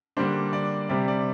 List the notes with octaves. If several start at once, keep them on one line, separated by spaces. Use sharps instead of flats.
D3 G3 A#3 D4 C5
D5
C3 G3 C4 D5
D5